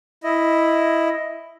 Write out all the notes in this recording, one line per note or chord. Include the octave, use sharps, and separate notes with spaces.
E4 D#5